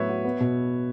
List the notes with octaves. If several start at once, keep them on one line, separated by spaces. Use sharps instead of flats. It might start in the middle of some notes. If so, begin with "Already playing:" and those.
Already playing: A2 F#3 B3 B4 C#5 E5
F#4
B3
B2